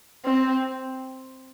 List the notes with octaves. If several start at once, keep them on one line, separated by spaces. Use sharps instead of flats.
C4